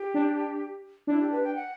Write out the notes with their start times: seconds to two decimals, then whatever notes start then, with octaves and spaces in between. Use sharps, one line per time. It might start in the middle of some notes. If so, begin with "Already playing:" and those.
Already playing: G4
0.14 D4
1.07 D4 E4
1.20 G4
1.31 B4
1.43 G5
1.55 F#5